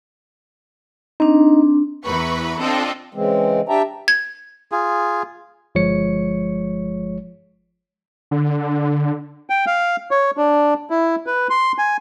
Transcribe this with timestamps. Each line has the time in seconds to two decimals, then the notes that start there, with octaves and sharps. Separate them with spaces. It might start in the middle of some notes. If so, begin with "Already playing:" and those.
1.20 C4 D4 D#4
2.05 E2 E3 B4 A#5 B5 C#6
2.60 C4 D4 F4 A4 D#5 G5
3.14 C#3 E3 G#3 C4
3.69 D4 G4 E5 G5 A5 A#5
4.08 G#6
4.72 F4 G#4
5.75 G1 F3 G#3 C#5 C#7
8.31 D3
9.50 G5
9.67 F5
10.11 C#5
10.37 D4
10.90 E4
11.27 B4
11.50 C6
11.78 G#5